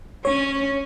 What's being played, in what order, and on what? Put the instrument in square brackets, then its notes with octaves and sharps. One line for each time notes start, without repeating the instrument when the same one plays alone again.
[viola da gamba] C#4 [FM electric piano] C#5